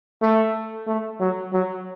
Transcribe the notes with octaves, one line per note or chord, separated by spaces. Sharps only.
A3
A3
F#3
F#3